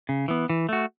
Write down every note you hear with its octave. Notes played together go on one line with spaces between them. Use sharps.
C#3
E3 B3
E3
A3 F#4